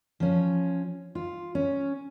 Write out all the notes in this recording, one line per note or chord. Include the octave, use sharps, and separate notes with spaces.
F3 C#4
F4
C#4